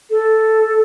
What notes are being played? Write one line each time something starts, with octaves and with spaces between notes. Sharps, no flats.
A4